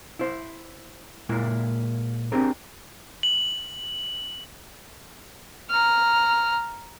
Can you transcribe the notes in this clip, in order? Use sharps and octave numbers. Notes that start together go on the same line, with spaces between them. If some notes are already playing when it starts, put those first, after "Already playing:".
E4 C5
A#2 G#3 A#3 E4
C4 D4 G4 G#4 A#4
F#7
A#5 F6